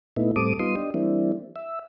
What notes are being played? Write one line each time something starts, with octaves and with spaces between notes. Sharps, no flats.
A#2 A3 B3 D#4 E4
A2 G3 C4 A4 D6 D#6
G3 B3 D#4 F4 C6 D#6
D4 G4 D#5
E3 G3 A#3 C4 D4 E4
E5